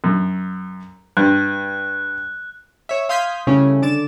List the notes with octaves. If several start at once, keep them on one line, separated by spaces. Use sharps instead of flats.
F#2
G2 F#6
C#5 E5
F5 C6 D#6 G6 G#6 B6
C#3 G3 A3 C#4 E4
D3 D6 A6 E7